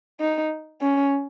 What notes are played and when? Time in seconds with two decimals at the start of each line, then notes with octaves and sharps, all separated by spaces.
0.20 D#4
0.81 C#4